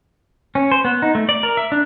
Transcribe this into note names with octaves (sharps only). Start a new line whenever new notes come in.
C#4
C5
B3
D#4
A3
D5
A#4
E5
D4